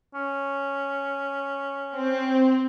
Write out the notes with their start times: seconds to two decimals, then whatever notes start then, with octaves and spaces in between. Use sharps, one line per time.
0.14 C#4
1.96 C4